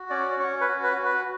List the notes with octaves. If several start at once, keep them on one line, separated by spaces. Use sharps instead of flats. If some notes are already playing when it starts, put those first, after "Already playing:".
Already playing: F#4
C#4 D5
C#4 C#5
B4
F#4
B4
F#4
B4